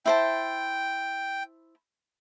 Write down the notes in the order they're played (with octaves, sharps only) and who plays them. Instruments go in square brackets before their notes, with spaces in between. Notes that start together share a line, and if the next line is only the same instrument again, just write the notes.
[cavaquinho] E4 C5 A5 [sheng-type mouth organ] G5